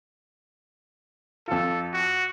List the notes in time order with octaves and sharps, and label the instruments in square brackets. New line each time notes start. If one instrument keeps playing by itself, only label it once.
[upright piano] F2 F4 [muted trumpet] A4
[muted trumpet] F#4